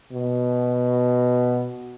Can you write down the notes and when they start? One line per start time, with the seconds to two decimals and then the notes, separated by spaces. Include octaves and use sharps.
0.12 B2